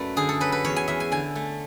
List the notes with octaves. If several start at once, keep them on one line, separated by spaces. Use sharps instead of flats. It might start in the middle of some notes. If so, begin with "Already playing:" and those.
Already playing: F#2 A3 B4 D5
D3 G#4
A4
F#3 B4
B4
E2 C#5
G#5
E2 E5
G#5
D3 G#5
A3